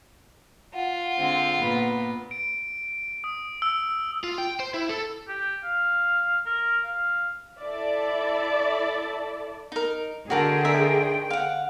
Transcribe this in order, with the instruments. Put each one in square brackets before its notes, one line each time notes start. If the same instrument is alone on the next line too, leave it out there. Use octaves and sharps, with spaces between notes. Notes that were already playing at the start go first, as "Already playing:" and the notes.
[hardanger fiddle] F4 [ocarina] F#5
[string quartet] D3 G#3 C4
A#2 B3
[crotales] D7
D#6
E6
[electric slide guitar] F4
G5
C5
E4
A4
[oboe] G4
F5
A#4
F5
[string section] E4 A4 D5 E5
[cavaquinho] D#4 A#4
[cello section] D3 G#4 [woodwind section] D#3 C5 G5 [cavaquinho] F#4 A#4 A5
[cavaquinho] A#4 E5
F5 F#5